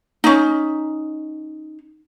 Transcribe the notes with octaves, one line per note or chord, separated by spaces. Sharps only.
C#4 D#4